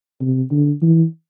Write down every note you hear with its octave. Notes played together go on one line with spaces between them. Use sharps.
C3
D3
E3